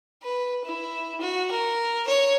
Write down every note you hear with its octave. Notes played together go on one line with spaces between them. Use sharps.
B4
E4
F#4
A#4
C#5